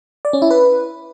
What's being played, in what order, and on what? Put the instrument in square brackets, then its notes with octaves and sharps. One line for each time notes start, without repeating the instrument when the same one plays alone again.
[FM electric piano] D5
C#4
E4
B4